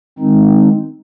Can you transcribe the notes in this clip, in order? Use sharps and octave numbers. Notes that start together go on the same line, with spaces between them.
D#3 G#3 C4 D#4